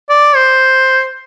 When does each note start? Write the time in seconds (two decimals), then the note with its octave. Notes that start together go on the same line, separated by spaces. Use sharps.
0.09 D5
0.36 C5